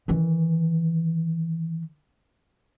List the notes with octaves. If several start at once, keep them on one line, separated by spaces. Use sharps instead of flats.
D#3 E3